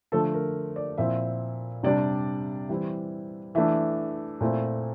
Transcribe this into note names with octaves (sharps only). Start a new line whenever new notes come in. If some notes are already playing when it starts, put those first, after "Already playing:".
D3 F3 A3 A4
A#4
D5
A#2 F3 C4 E4 E5
C3 G3 D4 D5
E3 G3 C4 E4
E3 A3 D4 E5
A#2 A3 C4 E4